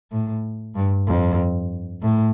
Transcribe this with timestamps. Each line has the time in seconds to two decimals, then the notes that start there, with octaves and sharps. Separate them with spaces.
0.12 A2
0.75 G2
1.07 F2
2.02 A2